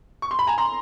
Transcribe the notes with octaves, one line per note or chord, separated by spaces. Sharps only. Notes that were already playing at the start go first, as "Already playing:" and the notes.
C#6
C6
B5
G#5 A#5
A#5 C6